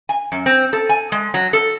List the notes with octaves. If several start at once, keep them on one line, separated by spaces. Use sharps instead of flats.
G#5
F#2
C4
A4
G#5
G#3
F#3
A4